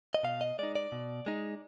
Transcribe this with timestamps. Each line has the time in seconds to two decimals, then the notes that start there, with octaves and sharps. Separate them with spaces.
0.14 D#5
0.23 B2 F5
0.41 D#5
0.59 G#3 D#4 D5
0.75 D5
0.92 B2
1.26 G#3 D#4